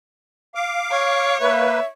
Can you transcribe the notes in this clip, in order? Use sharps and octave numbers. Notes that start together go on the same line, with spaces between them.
F5 D6
C#5
A#3 B4 E5